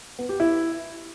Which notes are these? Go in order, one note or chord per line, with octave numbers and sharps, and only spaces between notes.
B3
G4
E4